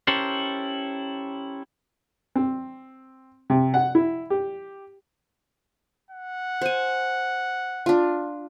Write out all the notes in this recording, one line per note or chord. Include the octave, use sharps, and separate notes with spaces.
C#4 E4 G4 A4 A#4 C5
C4
C3
F#5
E4
G4
F#5
C5 G#5
D4 F4